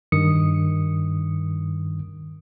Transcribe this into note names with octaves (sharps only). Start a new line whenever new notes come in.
G2 D#3 D#6 C#7